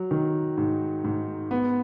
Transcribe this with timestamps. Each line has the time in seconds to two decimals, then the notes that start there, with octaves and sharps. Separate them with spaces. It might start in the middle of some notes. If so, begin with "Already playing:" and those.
Already playing: F#3
0.11 D#3
0.57 G#2
1.04 G#2
1.51 B3